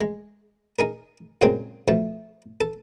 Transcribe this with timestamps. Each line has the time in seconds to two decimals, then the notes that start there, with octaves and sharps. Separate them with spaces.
0.01 G#3
0.79 D#4 G#4 A#4
1.41 F#2 A#2 C#3 G#3 A#3 C4
1.88 B2 F3 A3
2.61 A4